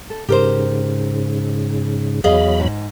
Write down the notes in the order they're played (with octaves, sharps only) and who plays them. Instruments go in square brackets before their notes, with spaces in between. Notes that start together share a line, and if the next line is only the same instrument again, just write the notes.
[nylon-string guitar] A4
[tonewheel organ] G#2 C#3 [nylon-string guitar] G4 A#4 C5
[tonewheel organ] E2 F#3 B5 [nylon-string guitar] G#4 D#5 F5
[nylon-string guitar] G#2